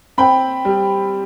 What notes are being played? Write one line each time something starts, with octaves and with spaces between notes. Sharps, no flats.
C4 G5 B5
G3